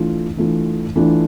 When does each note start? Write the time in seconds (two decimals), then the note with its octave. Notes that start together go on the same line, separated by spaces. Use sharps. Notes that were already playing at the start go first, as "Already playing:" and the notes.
Already playing: E3 A3 D4 F4
0.37 E3 A3 D4 F4
0.96 E3 A3 D4 F4